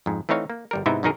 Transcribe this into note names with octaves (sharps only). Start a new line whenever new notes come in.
F2 G#2
E3 A3 C4 D#4 C#5 F5
A#3
G1 G3 A#4
G#2 C3 B3 D#4 E4 E5
F#2 B2 D#3 D#4 G#4 A#4